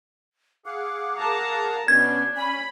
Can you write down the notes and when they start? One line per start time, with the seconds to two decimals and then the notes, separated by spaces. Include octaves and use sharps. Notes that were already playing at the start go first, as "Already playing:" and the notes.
0.66 G#4 F5 F#5 D6
1.20 A#4 A5 A#5
1.88 B2 B3 C#4 D4 G#6
2.36 C#4 G#5 B5